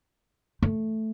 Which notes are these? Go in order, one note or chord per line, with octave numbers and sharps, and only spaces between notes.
A3